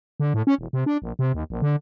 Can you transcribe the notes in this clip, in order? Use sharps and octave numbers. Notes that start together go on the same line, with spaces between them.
D3
A2
C#4
E1
C3
D4
A#1
C3
D#2
A#1
D3